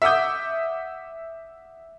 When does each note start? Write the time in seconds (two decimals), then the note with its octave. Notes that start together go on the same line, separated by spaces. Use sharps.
0.02 E5 F#5 D6 D#6 G6